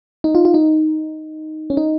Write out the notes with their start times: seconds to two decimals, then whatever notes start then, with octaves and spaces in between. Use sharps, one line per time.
0.24 D#4
0.35 F4
0.45 F4
0.54 D#4
1.70 C#4
1.77 D#4